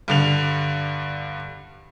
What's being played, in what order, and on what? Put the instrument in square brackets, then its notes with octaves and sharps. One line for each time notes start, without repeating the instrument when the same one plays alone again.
[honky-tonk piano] G2 D3 F7